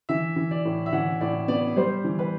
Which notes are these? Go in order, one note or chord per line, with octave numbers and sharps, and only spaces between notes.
E3 E5
E3
D5
A2
E5
E3 F#5
A2 D5
B3 D5
G3 C5
E3
B4